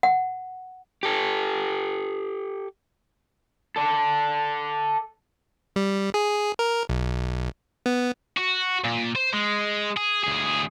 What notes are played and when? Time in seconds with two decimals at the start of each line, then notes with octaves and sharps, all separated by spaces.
0.03 F#5
1.03 G4 A4
3.76 A4 D5
5.76 G3
6.14 G#4
6.59 A#4
6.89 B1
7.86 B3
8.37 F#4
8.84 A#2
9.16 C5
9.33 G#3
9.97 G#4
10.24 D2 G#4